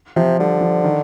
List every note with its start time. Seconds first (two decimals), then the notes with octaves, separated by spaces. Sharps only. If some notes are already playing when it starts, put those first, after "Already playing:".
0.16 C3 F3
0.39 D3 G3
0.61 F3
0.84 D#3